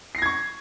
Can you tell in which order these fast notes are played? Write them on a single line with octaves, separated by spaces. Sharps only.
C7 A#6 G#6 C#6